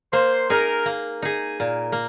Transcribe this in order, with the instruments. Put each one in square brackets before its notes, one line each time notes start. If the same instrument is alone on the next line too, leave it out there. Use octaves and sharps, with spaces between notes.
[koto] A#3 [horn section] C5
[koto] D#4 G#4 [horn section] A#4
[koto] A#3
D#4 G#4
[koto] A#2 [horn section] A#4
[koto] A#3